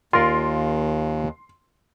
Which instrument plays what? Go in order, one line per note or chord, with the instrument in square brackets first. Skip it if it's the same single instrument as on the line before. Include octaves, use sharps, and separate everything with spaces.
[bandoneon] D#2 [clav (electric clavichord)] F4 A#4 D5 [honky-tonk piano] C6